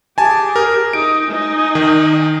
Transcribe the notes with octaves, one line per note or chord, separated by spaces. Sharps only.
G4 G#4 G#5 A5
A#4
D#4 D7
D#4 G#5
D#3